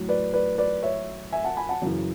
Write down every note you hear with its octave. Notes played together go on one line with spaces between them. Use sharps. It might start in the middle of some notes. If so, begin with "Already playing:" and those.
Already playing: A2 F#3
B4 D5
B4 D5
B4 D5
C#5 E5
E5 G#5
F#5 A5
G#5 B5
F#5 A5
F#2 C#3 E3